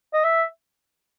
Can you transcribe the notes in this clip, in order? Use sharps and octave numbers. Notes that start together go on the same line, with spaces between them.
D#5
E5